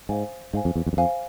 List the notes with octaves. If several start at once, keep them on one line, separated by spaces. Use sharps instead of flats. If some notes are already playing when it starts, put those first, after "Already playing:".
G#2 C5 F5 G#5
G#2 C5 F5 G#5
F2
E2
E2
F#2
F2 C5 F5 G#5